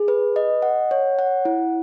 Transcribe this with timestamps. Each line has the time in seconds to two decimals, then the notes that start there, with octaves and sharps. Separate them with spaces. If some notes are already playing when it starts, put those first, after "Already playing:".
Already playing: G#4
0.08 B4
0.36 D#5
0.62 F#5
0.91 C#5
1.19 F#5
1.45 E4